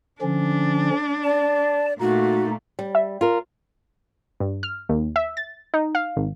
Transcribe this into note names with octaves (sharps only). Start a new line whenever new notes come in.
D3 F3 C#4 D4
D5 A5
A#2 A3 D#4 F#4
G3
E5
F4 A#4
G2
F6
D#2
E5
A6
D#4
F5
G#1